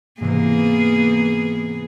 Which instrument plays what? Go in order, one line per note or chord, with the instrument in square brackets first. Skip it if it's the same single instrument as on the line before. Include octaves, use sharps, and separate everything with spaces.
[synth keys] G#2 C3 E3 [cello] A#3 [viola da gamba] B3 G#4